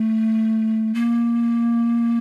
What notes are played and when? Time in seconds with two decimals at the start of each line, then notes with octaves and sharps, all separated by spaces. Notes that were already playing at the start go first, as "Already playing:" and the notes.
Already playing: A3
0.94 A#3